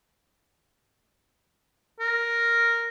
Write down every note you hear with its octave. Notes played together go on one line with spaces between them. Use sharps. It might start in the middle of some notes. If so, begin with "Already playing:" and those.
A#4